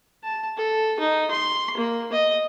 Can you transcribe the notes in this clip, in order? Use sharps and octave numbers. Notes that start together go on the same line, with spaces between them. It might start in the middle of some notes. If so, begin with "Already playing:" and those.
A5
A4
D#4
C6
A#3
D#5